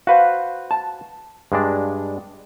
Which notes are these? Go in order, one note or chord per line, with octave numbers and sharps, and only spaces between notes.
F#4 B4 C5 F5
A5
G2 G#3 D4